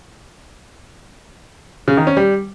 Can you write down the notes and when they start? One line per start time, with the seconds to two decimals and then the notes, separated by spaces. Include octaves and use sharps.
1.88 C#3
1.97 D#3
2.07 C#4
2.17 G3